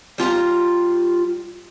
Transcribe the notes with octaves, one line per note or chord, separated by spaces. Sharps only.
G3 F4 G5 A#5